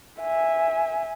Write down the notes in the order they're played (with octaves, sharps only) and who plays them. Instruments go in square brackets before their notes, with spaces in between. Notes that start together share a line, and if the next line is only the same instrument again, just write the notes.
[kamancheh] E5 G#5